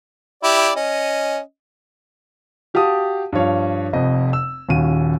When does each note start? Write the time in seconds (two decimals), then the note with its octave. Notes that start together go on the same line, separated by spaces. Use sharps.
0.44 E4 G4 D5
0.76 C#4 D#5
2.74 F#4 G4 F5 A5 D#6
3.32 G2 F3 C#5 F5
3.93 F1 F2 C4 D#5
4.33 E6
4.69 D#1 D#2 C#4 F#4 D#7